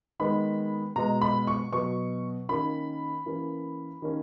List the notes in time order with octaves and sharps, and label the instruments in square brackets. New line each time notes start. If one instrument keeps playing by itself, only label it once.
[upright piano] D#3 G#3 B3 B5
B2 G#3 B3 A#5
B5
C#6
B2 F#3 B3 C#6
D#3 A#3 C#4 B5
E3 A#3 C#4
D#3 A#3 C#4